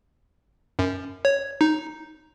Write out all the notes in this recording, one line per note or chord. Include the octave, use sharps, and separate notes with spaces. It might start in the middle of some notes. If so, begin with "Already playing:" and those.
F#2
C#5
D#4